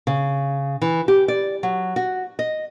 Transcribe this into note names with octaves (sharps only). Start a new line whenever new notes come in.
C#3
E3
G4
D5
F#3
F#4
D#5